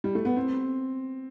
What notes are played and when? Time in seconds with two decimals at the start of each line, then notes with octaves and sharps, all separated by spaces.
0.04 G3
0.15 A3
0.25 B3
0.36 C4